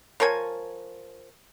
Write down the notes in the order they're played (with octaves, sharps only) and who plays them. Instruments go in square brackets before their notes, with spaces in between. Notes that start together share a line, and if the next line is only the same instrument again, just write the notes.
[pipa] F3 A#4 C#5 G#5